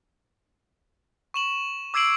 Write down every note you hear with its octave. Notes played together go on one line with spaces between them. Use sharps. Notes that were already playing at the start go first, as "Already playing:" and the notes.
C#6 E7 F#7
D6 E6 G#6 C7 D7 F#7